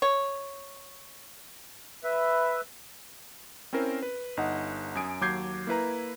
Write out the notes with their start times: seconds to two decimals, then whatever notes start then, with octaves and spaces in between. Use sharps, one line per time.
0.02 C#5
2.04 B4 E5
3.73 C4 C#4 E4 A#4 C5
4.02 B4
4.37 G1 D#4 D#5 F#5
4.95 F#2 G#5 D#6 D7
5.21 D#2 F#3 D6 G6 G#6 C7
5.67 A#3 E4 B4 A#5